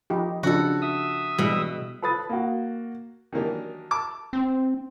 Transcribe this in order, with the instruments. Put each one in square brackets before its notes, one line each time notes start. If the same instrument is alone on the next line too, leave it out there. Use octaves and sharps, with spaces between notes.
[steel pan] F3 D#4 G4
[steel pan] C#3 F3 D4 [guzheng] F#4 A4
[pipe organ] E5 D#6 E6
[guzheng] B2 [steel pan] E3 G3 G#3
[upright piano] A4 B4 B5 D#6 A6
A#3 F#4
[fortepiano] D#3 E3 F#3 A#3 D4 G4
A5 D6
[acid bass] C4